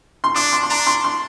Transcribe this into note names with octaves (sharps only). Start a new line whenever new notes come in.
C6
D4 D6
C6
C6
D4 A#5
C6
C6